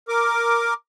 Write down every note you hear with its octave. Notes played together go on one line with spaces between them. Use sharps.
A#4 D6